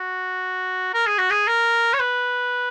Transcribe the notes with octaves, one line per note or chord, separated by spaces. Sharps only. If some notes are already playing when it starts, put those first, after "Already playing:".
Already playing: F#4
A#4
G#4
F#4
G#4
A#4
C#5
B4